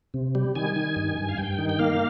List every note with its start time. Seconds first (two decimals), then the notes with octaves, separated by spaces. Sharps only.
0.14 C3
0.35 G3
0.55 D#3 G#5
0.76 D#3
0.96 G2
1.18 G2
1.29 F5
1.38 G2 G5
1.59 D#3
1.69 G5
1.79 A#3 F5